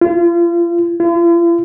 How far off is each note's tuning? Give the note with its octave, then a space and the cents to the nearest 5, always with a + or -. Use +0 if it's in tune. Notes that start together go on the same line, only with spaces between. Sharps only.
F4 -35
F4 -45